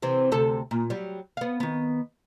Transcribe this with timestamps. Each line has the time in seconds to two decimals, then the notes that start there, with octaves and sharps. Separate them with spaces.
0.02 C3 E3 C4
0.32 D2 C3 A4
0.71 A#2
0.90 F#3 G3
1.37 B3 F5
1.60 D#3 B3